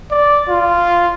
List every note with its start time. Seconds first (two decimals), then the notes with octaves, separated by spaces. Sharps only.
0.11 D5
0.49 F4